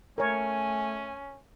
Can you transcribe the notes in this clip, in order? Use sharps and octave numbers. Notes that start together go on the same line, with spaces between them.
A3 C#4 A#4 C#5 G#5